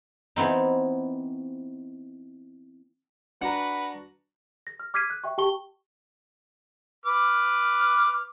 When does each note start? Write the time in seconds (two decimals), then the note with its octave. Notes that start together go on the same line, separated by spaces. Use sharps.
0.36 E3 B3 C4 D#4
3.42 D4 F#4 B4 F#5 A#5
4.67 A#6
4.80 F6
4.94 D6 F6 G#6 B6 C7 D#7
5.10 F#6
5.24 E5 G5 C#6
5.38 G4 G5 A5 C#6 G7
7.06 B4 D6 F6